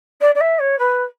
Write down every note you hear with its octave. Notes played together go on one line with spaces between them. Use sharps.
D5
D5
E5
C#5
B4